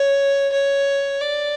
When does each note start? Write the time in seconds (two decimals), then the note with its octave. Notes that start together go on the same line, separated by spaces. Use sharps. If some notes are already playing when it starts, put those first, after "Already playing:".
Already playing: C#5
0.53 C#5
1.22 D5